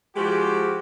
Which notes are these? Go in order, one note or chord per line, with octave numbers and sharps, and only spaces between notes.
F3 G#3 F#4 G4